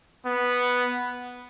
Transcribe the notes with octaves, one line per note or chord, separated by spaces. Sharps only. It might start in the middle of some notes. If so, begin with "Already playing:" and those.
B3